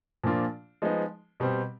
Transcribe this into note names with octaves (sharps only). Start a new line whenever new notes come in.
A#2 F3 A#3 D4 F4
F3 G#3 B3 D#4
B2 G3 C4